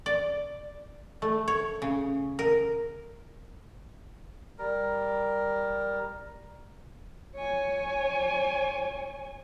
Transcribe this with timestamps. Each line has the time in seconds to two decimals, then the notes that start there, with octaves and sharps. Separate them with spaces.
0.06 D5
1.22 A3
1.48 C#5
1.82 C#3
2.39 A#4
4.59 G3 A#4
7.35 C#5 G#5